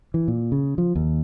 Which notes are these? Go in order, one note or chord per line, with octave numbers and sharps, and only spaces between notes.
E3
A#2
C#3
F3
D#2